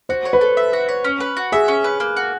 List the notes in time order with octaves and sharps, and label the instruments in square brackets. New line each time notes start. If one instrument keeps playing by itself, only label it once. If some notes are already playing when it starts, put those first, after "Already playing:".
[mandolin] F#4 [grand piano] C5
[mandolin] C#5
[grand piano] B4
[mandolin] A4
E5
F#4
C#5
C#4
B4
F#4
[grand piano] G#4 [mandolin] E5
[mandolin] C#4
B4
A#3
F#4